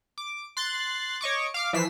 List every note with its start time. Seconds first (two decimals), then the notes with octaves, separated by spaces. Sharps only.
0.18 D6
0.57 C6 F#6 A6
1.21 C#5 D#5 C#6 D6
1.54 F5 D6 F6
1.73 E3 F3 B6 C7 E7